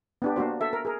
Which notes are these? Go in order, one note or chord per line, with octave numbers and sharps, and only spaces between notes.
B3 D4 G4
A#3 D4 F#4 C5
A4 E5
A#4
G#4 A#4